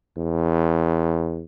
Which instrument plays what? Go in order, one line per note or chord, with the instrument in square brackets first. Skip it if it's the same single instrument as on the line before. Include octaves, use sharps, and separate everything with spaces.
[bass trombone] E2